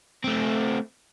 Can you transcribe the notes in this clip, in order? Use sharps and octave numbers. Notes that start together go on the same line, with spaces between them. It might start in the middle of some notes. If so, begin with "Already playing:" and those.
A3 C4